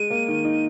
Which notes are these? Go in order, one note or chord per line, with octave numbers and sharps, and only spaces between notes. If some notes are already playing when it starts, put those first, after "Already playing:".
Already playing: G#3 D#7
A#3
D#3
D#4